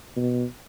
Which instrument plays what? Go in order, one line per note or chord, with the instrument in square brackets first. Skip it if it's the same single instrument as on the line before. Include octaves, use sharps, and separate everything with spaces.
[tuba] B2